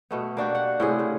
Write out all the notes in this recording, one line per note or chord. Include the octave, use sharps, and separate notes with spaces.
B2 A3 B3
A#3 D4 F#4 G4
F#5
A2 C3 G#4
C#3